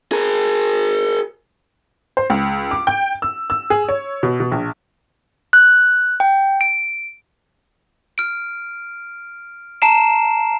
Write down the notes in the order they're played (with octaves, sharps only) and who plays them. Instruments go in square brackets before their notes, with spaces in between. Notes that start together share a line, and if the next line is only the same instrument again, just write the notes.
[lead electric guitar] G#4 A#4
[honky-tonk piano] C5
C#2
D6
G5
E6
E6
G#4
C#5
B2
B2
A#1
[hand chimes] F#6
G5
D7
[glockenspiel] F6 D7
A5 A#5 C7 D7 E7